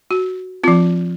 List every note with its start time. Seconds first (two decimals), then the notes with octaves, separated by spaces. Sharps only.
0.11 F#4
0.64 F3 C4 F4